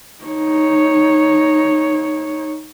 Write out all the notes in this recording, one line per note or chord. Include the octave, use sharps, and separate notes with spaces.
D#4 C#5